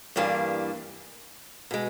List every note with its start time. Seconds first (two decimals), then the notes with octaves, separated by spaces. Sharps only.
0.16 G2 E3 G3 A#3 D4
1.71 B2 G#3